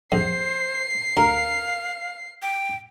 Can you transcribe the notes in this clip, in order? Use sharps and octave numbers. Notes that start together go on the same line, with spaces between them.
A#1 F2 C5 C7
D2 A#4 F5
G5